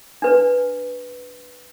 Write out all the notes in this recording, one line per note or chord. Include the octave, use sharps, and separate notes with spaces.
D4 B4